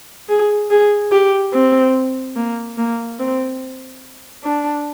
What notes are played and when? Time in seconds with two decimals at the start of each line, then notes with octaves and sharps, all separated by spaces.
0.29 G#4
0.71 G#4
1.11 G4
1.53 C4
2.36 A#3
2.78 A#3
3.19 C4
4.43 D4